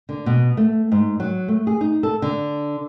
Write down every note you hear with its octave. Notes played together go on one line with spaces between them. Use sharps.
D3
B2
A3
G#2
F#3
A3
G#4
D#4
A4
D3